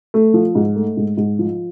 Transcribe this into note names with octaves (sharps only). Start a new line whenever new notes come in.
A3
F3
G#2
A3
G#2
G#2
F3